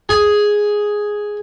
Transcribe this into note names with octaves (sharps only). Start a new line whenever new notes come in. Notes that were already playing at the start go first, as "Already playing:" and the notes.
G#4